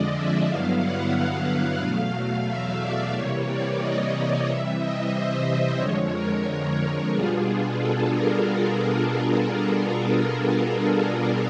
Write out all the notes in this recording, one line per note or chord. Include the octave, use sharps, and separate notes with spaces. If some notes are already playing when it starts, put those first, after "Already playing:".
Already playing: F2 D3 F3 G#3 D5 D#5
E5
G2 D3 F#3 B3 E4 F5
F#5
F5
E2 B2 F#3 A3
E5
D5
C3 E3 G3 A#3 C#5
D5
D#5
C3 E3 G3 E5
D#5
C5
F2 D3 F3 G#3 C#5
A#4
B2 G3 B3 D4 F4 G#4
G#4
A4
A#4